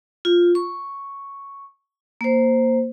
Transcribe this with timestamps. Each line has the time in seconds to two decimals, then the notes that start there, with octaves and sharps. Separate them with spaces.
0.25 F4
0.55 C#6
2.21 A#3 C5